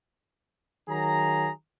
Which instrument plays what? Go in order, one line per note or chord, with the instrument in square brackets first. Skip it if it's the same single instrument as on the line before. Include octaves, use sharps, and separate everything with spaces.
[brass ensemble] D#3 F#3 G#4 A#5